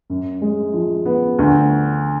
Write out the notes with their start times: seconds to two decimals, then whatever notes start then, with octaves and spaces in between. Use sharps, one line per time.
0.10 F#2
0.41 G#3
0.74 F3
1.06 B3
1.38 D2